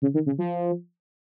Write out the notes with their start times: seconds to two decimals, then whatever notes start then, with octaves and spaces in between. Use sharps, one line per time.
0.02 C#3
0.14 D#3
0.26 C#3
0.38 F3